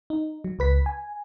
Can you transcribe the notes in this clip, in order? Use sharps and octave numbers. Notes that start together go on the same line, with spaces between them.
D#4
F#3
C#2 B4 B6
G#5